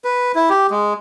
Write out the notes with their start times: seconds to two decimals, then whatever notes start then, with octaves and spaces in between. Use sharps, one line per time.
0.05 B4
0.35 E4
0.50 G4
0.71 G#3